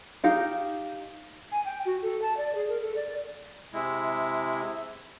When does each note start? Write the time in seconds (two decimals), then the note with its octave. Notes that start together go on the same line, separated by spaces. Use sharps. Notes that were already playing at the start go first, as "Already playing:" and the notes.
0.24 D#4 G4 F5
1.52 G#5
1.65 G5
1.85 F#4
2.02 A4
2.22 A5
2.37 D5
2.55 G#4
2.69 A#4
2.82 A4
2.96 D5
3.73 C3 G#3 E4